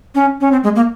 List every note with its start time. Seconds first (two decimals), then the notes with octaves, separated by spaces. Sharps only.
0.15 C#4
0.41 C#4
0.52 C4
0.64 G#3
0.76 A#3